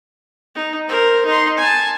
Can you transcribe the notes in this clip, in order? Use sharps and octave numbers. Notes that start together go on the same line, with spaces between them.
D#4
A#4 C5
D#4 C6
G#5 A5